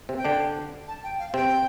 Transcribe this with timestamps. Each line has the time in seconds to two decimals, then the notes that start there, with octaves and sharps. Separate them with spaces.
0.09 C3 C4
0.17 G5
0.25 D3 D4
0.88 A5
1.04 G5
1.19 F5
1.34 C3 C4 G5